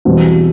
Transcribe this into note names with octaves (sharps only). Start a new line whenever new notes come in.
E2 B2 G3 C4 F#4